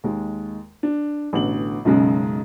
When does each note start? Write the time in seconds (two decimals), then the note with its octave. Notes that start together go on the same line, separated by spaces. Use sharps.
0.04 D#2 G#3
0.83 D4
1.33 A1 B2 D3 F#7
1.85 B1 F#2 C#3 G#3